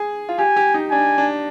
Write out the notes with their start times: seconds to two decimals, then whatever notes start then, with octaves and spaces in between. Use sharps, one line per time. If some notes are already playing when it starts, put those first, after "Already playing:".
Already playing: G#4
0.29 F4
0.38 G4 G#5
0.56 G4
0.74 D#4
0.91 D4 G#5
1.18 D4